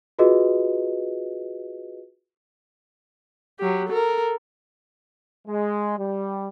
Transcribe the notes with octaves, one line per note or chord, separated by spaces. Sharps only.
F4 F#4 G#4 B4 D#5
F#3 G4
A4 A#4
G#3
G3